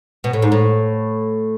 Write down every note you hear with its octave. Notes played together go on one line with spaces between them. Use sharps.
B2
A2
G#2
A2